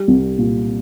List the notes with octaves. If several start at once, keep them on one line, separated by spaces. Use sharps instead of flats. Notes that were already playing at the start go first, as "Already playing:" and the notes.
Already playing: G3
C2
A#2